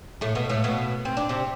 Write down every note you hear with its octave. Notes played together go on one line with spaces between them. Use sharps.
A2 A3
B2 B3
A2 A3
B2 B3
C4
D4
C3 C4